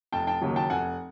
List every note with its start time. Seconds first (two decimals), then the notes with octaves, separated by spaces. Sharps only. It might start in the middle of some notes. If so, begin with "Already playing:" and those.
0.12 F1 G5 A5
0.27 G5 A5
0.41 D#2 C#3 F#3
0.56 G5 A5
0.70 F1 F#5 G#5